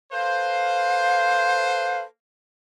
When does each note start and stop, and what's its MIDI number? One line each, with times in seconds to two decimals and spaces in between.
0.13 2.05 69
0.13 2.05 71
0.13 2.05 72
0.13 1.99 77